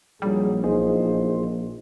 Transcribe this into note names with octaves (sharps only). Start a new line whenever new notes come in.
A#1 D#2 F#3 G3 G#4
B1 E2 D#4 F4 G#4 C5 D#5